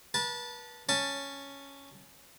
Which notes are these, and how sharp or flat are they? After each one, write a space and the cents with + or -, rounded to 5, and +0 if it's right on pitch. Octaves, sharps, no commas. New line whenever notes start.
B4 -35 A5 +0
C#4 +0 A5 +10